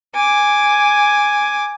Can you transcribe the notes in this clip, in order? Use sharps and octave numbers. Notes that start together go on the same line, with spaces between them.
G#5 D6